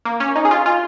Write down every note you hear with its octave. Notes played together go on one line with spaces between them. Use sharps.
A#3
C#4
D#4
G#4
F4
F4